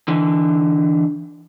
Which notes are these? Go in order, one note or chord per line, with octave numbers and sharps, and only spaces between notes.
D3 E3